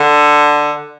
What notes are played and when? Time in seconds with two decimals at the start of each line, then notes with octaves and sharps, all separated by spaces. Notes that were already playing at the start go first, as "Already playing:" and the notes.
Already playing: D3